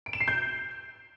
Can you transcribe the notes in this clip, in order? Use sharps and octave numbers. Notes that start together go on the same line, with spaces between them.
D7
E7
C7
G6